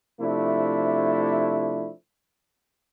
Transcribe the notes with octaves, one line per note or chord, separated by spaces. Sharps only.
C3 F3 A3 D4 E4